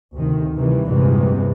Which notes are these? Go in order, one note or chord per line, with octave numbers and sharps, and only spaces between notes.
D2 C3 D#3
C3 D#3 E3 G3
A#1 E2 G2 C3 E3 G#3